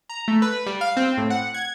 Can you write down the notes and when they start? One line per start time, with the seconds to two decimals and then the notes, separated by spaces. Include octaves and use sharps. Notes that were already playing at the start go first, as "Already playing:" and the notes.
0.09 A#5
0.28 A3
0.42 B4
0.67 G3
0.81 F5
0.97 C4
1.17 A2
1.30 F#5
1.54 G#6